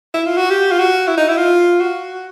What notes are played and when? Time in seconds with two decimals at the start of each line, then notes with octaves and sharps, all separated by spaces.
0.14 E4
0.26 F4
0.37 F#4
0.50 G4
0.72 F4
0.79 F#4
1.08 E4
1.17 D#4
1.28 E4
1.37 F4
1.81 F#4